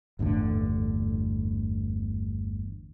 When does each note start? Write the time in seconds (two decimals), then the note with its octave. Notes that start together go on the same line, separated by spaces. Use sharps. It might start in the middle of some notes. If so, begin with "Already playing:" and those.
0.19 G1 E2 A2 D3